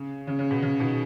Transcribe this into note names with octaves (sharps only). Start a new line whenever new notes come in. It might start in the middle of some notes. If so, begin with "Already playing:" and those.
Already playing: C#3
C#3
C#3
B2
C#3
B2 D#3